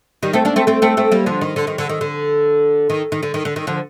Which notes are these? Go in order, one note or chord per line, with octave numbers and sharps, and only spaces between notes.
D#3 G3
A3 C4
A#3 D4
A3 C4
A3 C4
A3 C4
A3 C4
G3 A#3
D3 F3
D#3
D3
D#3
D3
D#3
D3
D#3
D#3
D3
D#3
D3
D#3
D3 F3